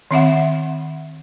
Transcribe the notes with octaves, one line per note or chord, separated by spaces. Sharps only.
D#3 C4 E5 F#5